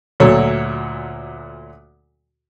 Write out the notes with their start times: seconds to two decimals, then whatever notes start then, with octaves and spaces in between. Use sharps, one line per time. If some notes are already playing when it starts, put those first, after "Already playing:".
0.20 D2 A#2 F#3 A4 C#5